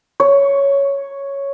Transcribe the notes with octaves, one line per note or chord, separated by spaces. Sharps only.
C#5